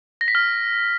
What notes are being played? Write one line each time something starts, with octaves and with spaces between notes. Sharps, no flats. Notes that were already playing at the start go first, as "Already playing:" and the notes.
A#6
B6
F6